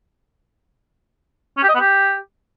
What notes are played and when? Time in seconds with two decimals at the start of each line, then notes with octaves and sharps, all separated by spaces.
1.57 C#4
1.63 G4
1.69 D#5
1.74 B3
1.80 G4